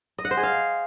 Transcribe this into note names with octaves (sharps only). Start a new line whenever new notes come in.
D#5
F#5
C5
G#4
F5